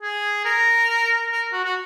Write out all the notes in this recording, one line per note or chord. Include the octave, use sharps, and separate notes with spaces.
G#4
A#4
A#4
F#4
F#4